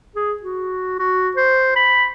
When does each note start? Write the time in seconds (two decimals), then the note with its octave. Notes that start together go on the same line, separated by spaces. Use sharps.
0.16 G#4
0.43 F#4
0.99 F#4
1.37 C5
1.76 B5